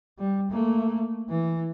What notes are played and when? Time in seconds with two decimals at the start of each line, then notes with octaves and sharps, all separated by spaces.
0.19 G3
0.51 A3 A#3
1.29 E3